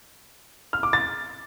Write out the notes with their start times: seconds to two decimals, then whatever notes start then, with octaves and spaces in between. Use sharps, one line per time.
0.73 F6
0.83 D6
0.93 A6